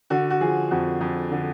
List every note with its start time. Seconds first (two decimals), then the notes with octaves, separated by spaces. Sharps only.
0.10 D3 F#4
0.30 F#4
0.41 F3 G#4
0.71 F2 F#4
1.01 F2
1.31 D3